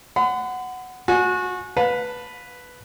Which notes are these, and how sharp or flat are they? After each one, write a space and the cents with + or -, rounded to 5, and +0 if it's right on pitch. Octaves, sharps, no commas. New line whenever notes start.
F#5 +0 B5 +45
F#4 -25 G#5 +20
B4 +0 F5 +40 A5 +15